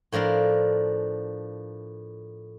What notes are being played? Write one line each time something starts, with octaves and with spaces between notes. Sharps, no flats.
A2 F3 D4 A#4 C6